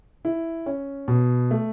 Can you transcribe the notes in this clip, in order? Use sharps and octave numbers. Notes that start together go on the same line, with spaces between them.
E4
C#4
B2
A3